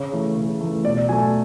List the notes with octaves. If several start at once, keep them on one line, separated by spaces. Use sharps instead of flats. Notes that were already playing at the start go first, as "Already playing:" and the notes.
Already playing: C#3 C#5
E3 A3
C#3
E3 A3
B2 D5
F#3 A3 G#5
A5